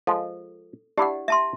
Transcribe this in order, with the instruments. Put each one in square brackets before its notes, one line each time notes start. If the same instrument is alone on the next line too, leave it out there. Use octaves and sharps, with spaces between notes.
[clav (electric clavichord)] F3 G#3 [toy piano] A4
[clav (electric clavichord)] D4 E4 D5 [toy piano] G4 F#5
[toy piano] E5 A5 C6